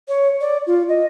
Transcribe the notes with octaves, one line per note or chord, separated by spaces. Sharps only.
C#5
D5
F4
D#5